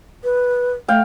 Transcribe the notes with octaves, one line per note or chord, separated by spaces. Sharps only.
B4
A3 F5 G5